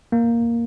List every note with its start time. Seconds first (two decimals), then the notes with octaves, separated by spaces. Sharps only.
0.12 A#3